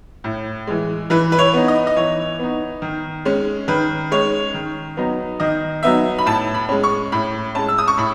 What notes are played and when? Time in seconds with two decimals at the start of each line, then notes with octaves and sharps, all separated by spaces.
0.24 A2
0.67 E3 G#3
1.10 E3 B4
1.32 B4
1.39 C#5
1.53 B3 D#4
1.68 D#5
1.87 D#5
1.96 E3 C#5
2.39 B3 D#4
2.82 D#3
3.25 G#3 C#4
3.68 D#3 B4
4.11 G#3 C#4 C#5
4.54 D#3
4.97 F#3 B3 D#4
5.40 D#3 D#5
5.83 F#3 B3 D#4 E5
6.18 B5
6.26 A2 A5
6.54 B5
6.69 G#3 C#4
6.83 C#6
7.12 A2 B5
7.55 G#3 C#4 A5
7.68 E6
7.78 D#6
7.88 C#6
7.97 A2 B5